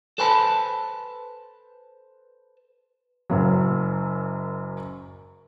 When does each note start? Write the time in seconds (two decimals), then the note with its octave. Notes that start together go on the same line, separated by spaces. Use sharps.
0.18 A4 B4 C5 G#5 A5 B5
3.30 F#1 F#2 F#3